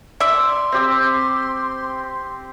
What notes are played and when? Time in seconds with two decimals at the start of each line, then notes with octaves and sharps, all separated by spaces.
0.20 D5 E5 C6
0.72 C4 G4